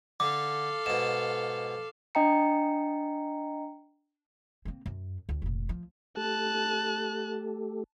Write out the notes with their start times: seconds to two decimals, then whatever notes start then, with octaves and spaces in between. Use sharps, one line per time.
0.20 D3 A4 F5 D6
0.86 G#2 B2 E7
2.15 D4 D#5 G5 A#5 C#7
4.65 A#3 C4
4.86 F#2
5.29 D2
5.42 F1 A#2
5.69 F3
6.17 A3 G4 A4 A5 F#6